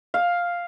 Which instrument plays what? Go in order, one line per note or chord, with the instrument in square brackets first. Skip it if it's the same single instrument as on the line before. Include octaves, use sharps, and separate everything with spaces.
[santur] F5